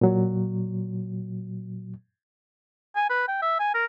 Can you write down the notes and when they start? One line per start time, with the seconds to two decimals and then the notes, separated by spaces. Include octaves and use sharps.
0.01 A#2 F#3
2.96 G#5
3.10 B4
3.28 G5
3.42 E5
3.59 G#5
3.74 A#4